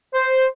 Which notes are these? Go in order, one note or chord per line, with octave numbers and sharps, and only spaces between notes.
C5